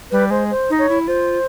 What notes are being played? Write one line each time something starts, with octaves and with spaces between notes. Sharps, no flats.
G3 B4
G#3 C5
C5
D#4
C#5
E4
F4 C5